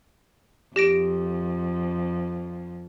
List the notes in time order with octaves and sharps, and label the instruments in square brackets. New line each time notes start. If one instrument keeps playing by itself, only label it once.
[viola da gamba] F2 [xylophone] G4 A#6 D7